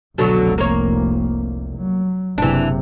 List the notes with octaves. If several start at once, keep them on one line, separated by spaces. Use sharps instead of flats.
F1 C2 B2 D3 F#3
A#3 C#5
F#3
F#1 C3 E3 D4